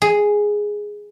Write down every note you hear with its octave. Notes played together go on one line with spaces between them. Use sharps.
G#4